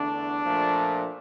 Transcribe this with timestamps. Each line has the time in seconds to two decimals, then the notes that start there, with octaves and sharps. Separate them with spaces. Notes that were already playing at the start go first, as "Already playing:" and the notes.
Already playing: E2 D3 A3 D4
0.45 A#2 F3 A3